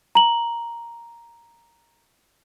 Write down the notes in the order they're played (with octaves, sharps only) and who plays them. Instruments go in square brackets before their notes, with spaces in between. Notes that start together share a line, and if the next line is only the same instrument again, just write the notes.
[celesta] A#5 F#7